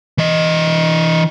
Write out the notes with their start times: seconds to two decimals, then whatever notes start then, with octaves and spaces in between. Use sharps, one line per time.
0.18 E3 D#5